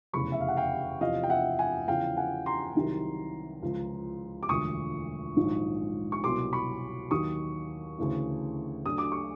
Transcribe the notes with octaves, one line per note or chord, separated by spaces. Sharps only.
F1 E2 C#3 B5 C#6
E5
F5
F#5
F5 G5
E2 C3 F3 D#5 F5
G5
E5 F#5
F#5 G#5
E2 C#3 F3 F5 G5
F#5 G#5
A#5 C6
C2 C3 D#3 F#3
C#2 C#3 F3
D6
E1 D2 D3 F3 C#6 D#6
A#1 G#2 D#3 F#3
C#6
C2 B2 F#3 C6 D6
B5 C#6
D#2 D#3 F#3 C#6 D#6
D2 C#3 E3
D2 D3 F#3 D#6
D6
C#6